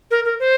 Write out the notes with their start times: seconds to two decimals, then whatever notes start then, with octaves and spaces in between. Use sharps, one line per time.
0.11 A#4
0.25 A#4
0.40 C5